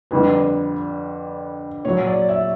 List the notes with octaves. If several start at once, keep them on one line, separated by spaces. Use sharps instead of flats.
F2 D3 G3 B4
A#2 F#3 C#5
D5
E5